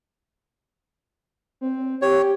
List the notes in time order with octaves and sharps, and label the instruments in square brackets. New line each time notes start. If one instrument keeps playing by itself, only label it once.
[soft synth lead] C4
[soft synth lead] G4 [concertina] C#5